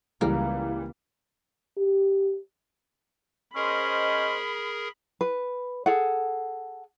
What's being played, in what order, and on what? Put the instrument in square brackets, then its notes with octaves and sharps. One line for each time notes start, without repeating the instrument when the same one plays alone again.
[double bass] C#2 [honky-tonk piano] E3 G3 [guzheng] A#3
[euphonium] G4
[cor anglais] C#4 [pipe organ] G#4 A#4 [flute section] C5 D#5 C6 [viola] B5
[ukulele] B4
G#4 A4 F#5